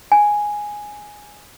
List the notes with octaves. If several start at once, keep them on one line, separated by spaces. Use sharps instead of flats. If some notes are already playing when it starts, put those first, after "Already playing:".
G#5